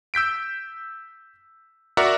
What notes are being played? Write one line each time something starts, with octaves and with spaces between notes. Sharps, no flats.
E6 G6 B6 D7
F#4 A#4 D5 E5 F#5 A#5